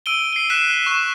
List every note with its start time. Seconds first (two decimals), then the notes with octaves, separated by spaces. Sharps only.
0.06 E6 D7 D#7 G7
0.33 C7 G7
0.50 F#6 B6 E7
0.86 C#6 E7